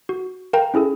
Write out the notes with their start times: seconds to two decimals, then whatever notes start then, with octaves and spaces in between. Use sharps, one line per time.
0.09 F#4
0.53 A#4 F5 G5 A#5
0.74 C#4 E4 G#4 A4